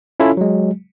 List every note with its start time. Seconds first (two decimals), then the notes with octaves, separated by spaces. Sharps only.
0.20 C#4 E4 F4 A4 C#5
0.37 F#3 G#3